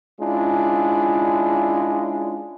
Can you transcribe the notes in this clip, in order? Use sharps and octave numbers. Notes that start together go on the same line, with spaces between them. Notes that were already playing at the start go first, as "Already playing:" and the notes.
G#3 C#4 D4 E4 F4